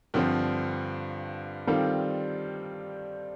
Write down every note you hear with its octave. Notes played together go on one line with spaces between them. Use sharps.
G2 D3 F3 C4
D#3 G3 C4 F4 A4